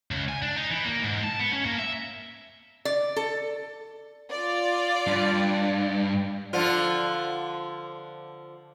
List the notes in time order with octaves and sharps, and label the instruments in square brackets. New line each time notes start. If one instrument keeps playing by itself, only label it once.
[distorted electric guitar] C#2
G#5
D4
D#4
E3
A#3
G#2
A5
B3
C#4
A#3
E5
[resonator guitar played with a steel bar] D5
A4
[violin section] F4 D5
[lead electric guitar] G2
[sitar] D3 F3 F4